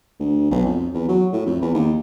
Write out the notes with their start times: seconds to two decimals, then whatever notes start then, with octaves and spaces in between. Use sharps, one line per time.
0.20 D2
0.51 B1
0.65 F2
0.94 E2
1.08 F#3
1.33 A2
1.47 F2
1.62 E2
1.75 D#2